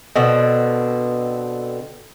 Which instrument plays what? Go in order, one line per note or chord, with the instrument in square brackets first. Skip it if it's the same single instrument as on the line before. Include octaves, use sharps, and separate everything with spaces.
[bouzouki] B2 D3 C4